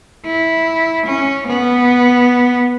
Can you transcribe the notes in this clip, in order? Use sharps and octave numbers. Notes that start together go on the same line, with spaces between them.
E4
C#4
B3